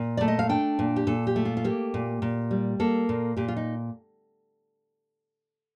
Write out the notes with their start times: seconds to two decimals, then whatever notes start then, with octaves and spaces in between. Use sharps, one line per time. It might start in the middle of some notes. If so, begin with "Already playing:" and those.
Already playing: A#2
0.17 A3 D5
0.28 D#5
0.39 F5
0.49 D4 G5
0.79 A#2
0.96 G4
1.07 A#2 A4
1.27 G4
1.36 A3
1.45 F4
1.57 F4
1.64 A#3 G4
1.94 A#2
2.22 A#2
2.51 G3
2.80 A#3 A4
3.09 A#2
3.37 A#2 G4
3.48 F4
3.57 D#4